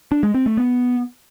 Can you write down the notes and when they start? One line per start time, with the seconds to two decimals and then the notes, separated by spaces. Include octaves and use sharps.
0.12 D4
0.23 G#3
0.34 C4
0.46 A3
0.57 B3